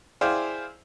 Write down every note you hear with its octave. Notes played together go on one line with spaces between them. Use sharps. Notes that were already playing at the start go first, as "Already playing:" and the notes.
E4 G#4 C5 D5 F5 G5